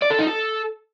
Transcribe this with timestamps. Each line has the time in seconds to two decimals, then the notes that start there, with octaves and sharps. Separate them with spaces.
0.02 D5
0.11 A4
0.19 D#4
0.27 A4